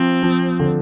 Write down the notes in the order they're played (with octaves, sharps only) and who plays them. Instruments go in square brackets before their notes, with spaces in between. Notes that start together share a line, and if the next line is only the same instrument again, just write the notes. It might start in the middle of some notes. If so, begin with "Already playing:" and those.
Already playing: [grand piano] F3 [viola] C4
[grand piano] F3
D3